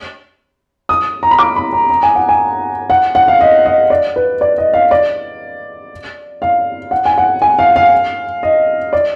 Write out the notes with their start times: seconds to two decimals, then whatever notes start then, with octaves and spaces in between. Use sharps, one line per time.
0.89 D#6
1.23 A#5
1.31 B5
1.39 D6
1.56 B5
1.73 A#5
1.90 A#5
2.03 G#5
2.15 F#5
2.29 G#5
2.90 F#5
3.15 F#5
3.28 F5
3.41 D#5
3.66 D#5
3.90 D5
4.16 B4
4.41 D5
4.58 D#5
4.73 F5
4.91 D5
6.42 F5
6.91 F#5
7.05 G#5
7.18 F#5
7.42 G#5
7.59 F5
7.76 F5
8.43 D#5
8.93 D5